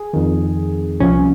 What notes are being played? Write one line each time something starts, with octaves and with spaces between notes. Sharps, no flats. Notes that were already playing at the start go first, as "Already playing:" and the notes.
Already playing: G#4
F2 D#3
C2 A#2 F3 C#4